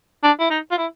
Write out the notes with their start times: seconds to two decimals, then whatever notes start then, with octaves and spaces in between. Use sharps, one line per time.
0.23 D4
0.39 E4
0.50 D#4
0.71 F4
0.78 E4